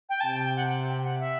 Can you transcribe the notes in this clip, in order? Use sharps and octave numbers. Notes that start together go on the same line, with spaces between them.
G5
C3 A5
G5
F#5
G5
F#5
E5